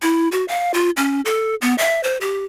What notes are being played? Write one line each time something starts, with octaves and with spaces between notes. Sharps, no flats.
E4
F#4
F5
F4
C#4
A4
B3
E5
C5
G4